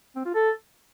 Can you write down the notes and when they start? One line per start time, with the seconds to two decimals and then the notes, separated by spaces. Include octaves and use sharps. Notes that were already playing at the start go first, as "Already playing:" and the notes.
0.16 C4
0.25 F4
0.35 A4